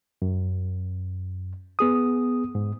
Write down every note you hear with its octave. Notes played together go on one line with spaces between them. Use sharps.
F#2
B3 G#4 D#6
G#2